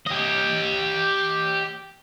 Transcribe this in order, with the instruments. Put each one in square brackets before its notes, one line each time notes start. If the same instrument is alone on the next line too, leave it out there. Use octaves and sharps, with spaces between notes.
[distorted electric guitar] G4 D#5